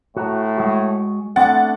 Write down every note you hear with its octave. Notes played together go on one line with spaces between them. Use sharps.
A2 F#4 A#5
G#3 F#4
A3 B3 C4 D4 F#5 A6